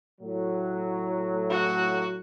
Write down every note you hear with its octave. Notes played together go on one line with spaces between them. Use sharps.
A2 F#3
F#4